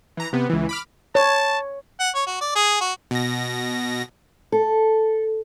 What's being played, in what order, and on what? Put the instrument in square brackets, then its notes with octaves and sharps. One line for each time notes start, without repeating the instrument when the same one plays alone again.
[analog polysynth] E3 A#5
C3 B3
C#2 E3
B5 D6 F6
[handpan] C#5 [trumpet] A5
[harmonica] F#5
C#5
F#4
D5
G#4
F#4
[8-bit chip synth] B2 A#6
[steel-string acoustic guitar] A4